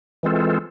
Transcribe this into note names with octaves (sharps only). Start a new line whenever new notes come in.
E3 G#3 C4 F4 A4